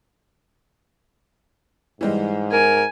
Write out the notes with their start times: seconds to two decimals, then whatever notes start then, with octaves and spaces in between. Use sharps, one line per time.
2.01 G#2 E3 G3 G#3
2.52 A#4 G#5